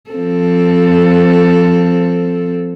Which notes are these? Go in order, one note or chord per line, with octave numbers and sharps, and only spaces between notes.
F3 C4 A4